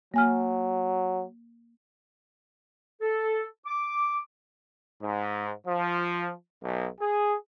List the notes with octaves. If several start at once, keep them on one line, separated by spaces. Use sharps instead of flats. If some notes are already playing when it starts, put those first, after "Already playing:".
F#3 A#3 G#5 F6
A4
D6
G#2
F3
B1
G#4